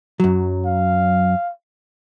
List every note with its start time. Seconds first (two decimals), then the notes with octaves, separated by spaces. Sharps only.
0.20 F#2 F#3
0.66 F5